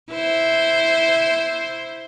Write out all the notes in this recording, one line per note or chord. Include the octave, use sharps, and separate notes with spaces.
E4 C5